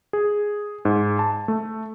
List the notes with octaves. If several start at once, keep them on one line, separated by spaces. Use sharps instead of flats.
G#4
G#2
A5
A3